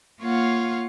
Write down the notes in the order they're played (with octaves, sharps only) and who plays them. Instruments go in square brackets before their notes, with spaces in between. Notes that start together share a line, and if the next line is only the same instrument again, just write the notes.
[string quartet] A#3 F4 C#5 F5 F#5